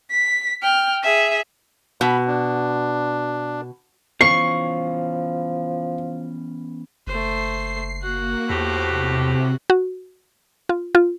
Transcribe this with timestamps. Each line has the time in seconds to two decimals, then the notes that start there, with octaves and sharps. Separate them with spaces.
0.11 B6
0.63 G5 F6
1.03 G#4 E5
2.01 B2 B5
2.27 D4
4.21 E3 F3 B3 C#4 C#6 C7
7.07 F#1 A3 C5 C7
8.02 A#3 F#4 F#5
8.50 E2 A2 F3 G4 C5 D6
8.88 C3
9.70 F#4
10.69 F4
10.95 F4